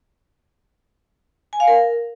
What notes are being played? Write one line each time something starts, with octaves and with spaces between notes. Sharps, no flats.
G#5
F5
A#4